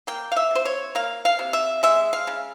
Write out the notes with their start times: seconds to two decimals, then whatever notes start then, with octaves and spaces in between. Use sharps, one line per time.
0.07 A#3 G5
0.32 F5
0.36 E5
0.51 C3 C5
0.65 C#5
0.95 A#3 F5
1.25 F5
1.39 C3
1.53 E5
1.83 G#3 E5
2.13 F5
2.27 C#3